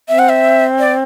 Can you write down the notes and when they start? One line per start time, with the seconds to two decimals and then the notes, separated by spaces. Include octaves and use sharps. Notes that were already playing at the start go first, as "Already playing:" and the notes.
0.08 C4 E5
0.19 F#5
0.29 E5
0.79 D5